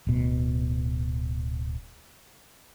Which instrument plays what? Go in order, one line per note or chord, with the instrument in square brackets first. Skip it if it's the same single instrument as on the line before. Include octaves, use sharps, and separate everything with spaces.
[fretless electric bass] D1 B2